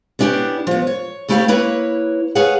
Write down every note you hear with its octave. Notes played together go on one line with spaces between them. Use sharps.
B3 C#4 D4 E4 G4
F3 B3
C#5
D2 A3 E4 G4 C#5 F5
A#3 E4 B4 C#5
G#4 B4 C#5 F5 F#5